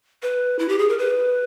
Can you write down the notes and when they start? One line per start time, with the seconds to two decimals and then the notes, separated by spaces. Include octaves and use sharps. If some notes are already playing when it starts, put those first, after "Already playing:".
0.23 B4
0.59 E4
0.69 G4
0.79 G#4
0.89 A#4
0.99 B4